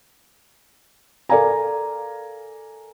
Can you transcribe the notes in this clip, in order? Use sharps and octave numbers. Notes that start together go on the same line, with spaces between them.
A4 A#4 D5 F5 G#5 A#5